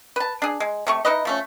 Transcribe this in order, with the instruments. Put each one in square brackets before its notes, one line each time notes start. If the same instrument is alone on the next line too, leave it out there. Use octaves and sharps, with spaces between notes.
[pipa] B4 A5
D4 G#4
G#3
C3 A3 C#6
D#4 E4 B4 D#5
F3 A3 C#4